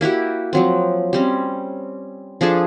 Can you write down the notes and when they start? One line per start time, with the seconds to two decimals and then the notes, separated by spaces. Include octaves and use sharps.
0.01 A#3 E4 F#4 G4
0.53 F3 F#3 C4
1.13 G3 C4 C#4
2.41 F3 D4 G#4 A4